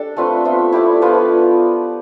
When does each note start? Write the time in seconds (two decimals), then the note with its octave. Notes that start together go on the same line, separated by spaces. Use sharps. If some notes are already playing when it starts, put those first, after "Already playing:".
Already playing: D4 G4 A4
0.17 A3 C4 F4 B4
0.45 B3 F4 C5 E5
0.72 E4 G4 D5
1.02 F3 B3 F4 B4